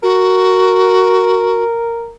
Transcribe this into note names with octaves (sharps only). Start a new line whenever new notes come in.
F#4 A#4